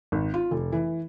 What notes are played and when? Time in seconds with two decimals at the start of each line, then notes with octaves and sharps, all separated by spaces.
0.12 G#1
0.34 F4
0.51 F1
0.72 E3